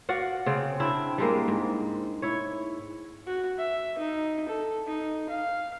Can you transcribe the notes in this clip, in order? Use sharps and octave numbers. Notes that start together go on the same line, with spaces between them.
F#4 D5 F5 F#5
C#3 C4 D5
C4 D4 E4
G3 G#3 A#3
G#2
E4 C#5
F#4
E5
D#4
A4
D#4
F5